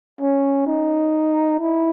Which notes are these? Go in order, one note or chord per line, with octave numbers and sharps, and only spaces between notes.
C#4
D#4
E4